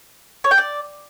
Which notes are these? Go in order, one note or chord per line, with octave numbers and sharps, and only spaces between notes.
C#5
G5
D5